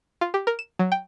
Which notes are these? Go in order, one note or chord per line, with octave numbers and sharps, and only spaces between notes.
F4
G4
A#4
E7
F#3
G5